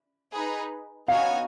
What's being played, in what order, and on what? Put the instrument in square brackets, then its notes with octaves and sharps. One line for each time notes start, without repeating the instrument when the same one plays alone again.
[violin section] D#4 G#4 B4
[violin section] B3 D#4 F#4 C#5 G#5 [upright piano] F5